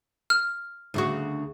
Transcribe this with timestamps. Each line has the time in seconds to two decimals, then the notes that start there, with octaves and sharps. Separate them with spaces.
0.30 F6
0.94 D2 C#3 F#4